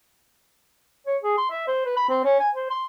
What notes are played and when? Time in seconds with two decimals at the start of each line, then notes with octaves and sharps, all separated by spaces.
1.07 C#5
1.23 G#4
1.37 C6
1.50 E5
1.67 C5
1.85 B4
1.97 B5
2.09 C4
2.24 C#4
2.40 G#5
2.55 C5
2.70 C6